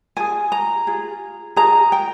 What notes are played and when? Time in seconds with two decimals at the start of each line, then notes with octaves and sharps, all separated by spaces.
0.17 F4 G#4 G#5
0.52 A#5
0.87 F4 G#4
1.56 F4 G#4 A#5
1.92 G5